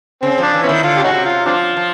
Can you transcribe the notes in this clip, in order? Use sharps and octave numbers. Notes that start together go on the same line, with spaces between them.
C#3 C4
F3 D4
E3
B3 C#4 E4
D#3
D3 F4
G4
C#3 C#4 D#4 F#4
C3
C3 F4
F3 C4 D4 F4
F3